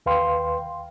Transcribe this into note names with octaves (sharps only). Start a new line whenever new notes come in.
D#2 B4 F5 G5 C6